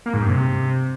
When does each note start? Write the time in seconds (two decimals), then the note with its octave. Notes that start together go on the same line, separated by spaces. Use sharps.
0.06 A#3
0.14 G#2
0.22 G2
0.30 C3